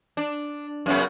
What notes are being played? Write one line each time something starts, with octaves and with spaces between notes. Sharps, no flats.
D4
F#2 C#3 B3